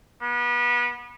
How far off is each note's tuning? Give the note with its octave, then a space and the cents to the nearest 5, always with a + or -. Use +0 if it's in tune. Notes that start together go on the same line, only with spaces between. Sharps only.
B3 -30